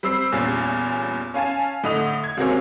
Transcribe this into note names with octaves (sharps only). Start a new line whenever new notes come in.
G3 C4 E6 C7
E2 G2 A#2 C#4
C#4 F5 G#5 A5
A2 D3 D#5 F7
G#6
C#2 C3 F#3 A#3 C4 C#4